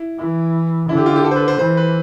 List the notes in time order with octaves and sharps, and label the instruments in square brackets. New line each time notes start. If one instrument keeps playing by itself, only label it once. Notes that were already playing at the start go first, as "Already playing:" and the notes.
Already playing: [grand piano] E4
[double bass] E3 [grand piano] E4
[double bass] D3 [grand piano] E4
[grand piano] G4
F4
G4
A4
C5
B4
C5
[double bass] E3 [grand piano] C5
[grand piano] B4